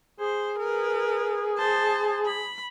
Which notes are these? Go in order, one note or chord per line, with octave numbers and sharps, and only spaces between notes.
G#4 C5
A#4 B4
C5 A5
B5